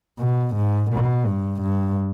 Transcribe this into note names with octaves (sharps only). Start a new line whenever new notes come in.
B2
G#2
B2
G2
G2